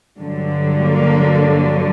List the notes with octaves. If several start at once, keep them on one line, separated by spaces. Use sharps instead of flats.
G2 D3 F#3
A#3